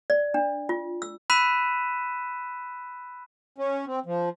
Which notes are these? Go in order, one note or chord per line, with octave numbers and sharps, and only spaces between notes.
D5
D4
F4
E6
B5 E6 F#6 B6 D#7 E7
C#4
C4
F3